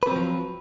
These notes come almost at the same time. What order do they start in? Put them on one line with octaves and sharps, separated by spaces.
B4 C4 F#3 F3